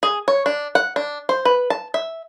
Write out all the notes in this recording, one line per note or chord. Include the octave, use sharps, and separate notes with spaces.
G#4
C#5
D4
F#5
D4
C5
B4
A5
E5